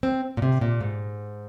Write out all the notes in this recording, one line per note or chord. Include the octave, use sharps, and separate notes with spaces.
C4
A#2
C3
A#2
G#2